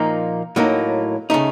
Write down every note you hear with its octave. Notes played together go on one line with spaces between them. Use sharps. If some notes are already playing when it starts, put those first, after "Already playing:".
Already playing: A#2 F3 A#3 D#4
A2 F#3 A#3 D#4
C#3 A3 D#4